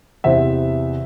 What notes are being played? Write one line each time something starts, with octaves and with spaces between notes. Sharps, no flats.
E2 C3 E3 C5 E5